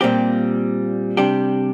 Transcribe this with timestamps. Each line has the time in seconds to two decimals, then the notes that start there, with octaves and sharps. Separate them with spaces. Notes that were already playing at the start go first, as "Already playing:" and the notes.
0.01 A#2 G3 C4 G4
1.17 C3 G3 D4 G4